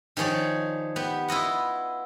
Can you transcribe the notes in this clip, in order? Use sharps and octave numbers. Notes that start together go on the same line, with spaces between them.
D#3 F3 G#4 C#5 D5
B3 G4
E4 F4 D#5 F#5